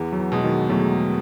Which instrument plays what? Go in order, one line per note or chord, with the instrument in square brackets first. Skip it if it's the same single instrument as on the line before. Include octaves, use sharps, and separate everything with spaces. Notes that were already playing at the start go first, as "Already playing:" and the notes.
Already playing: [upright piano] E2 [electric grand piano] E3
[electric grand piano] F#3
E3
[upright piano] B2 G#3
[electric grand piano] D#3 F#3
[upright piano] E2 [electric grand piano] F#3 A3